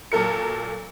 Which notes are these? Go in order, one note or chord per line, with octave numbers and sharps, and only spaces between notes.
A#2 F#3 A4 A#4 C#7